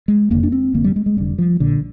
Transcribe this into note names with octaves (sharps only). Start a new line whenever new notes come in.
G#3
F1 F2 D3 A#3
D4
C4
F1 F2 D3 A#3
G3
G#3
G#3
F1 F2 D3 G3
F3
A#1 A#2 D3